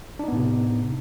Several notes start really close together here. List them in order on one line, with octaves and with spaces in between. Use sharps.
D4 D#4 B3 A2 C3